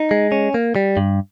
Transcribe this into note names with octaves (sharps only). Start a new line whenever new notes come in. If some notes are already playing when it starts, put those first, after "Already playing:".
Already playing: D#4
G#3
C#4
A#3
G3
G2